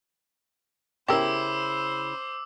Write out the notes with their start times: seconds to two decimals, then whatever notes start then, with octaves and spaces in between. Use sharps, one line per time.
1.08 C#3 E4 G4 A#4 C5 D6 E6